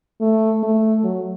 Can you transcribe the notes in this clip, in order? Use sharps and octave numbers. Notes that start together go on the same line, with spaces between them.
A3
A3
F#3